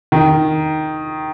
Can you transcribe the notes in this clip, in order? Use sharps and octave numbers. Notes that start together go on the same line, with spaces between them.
D#3